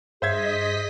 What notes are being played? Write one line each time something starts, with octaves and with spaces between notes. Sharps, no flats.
G2 G#4 C5 D#5 E5 G#6 B6